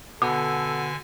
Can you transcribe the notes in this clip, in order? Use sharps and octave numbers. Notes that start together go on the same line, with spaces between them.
B2 D3 A4 G#5 D6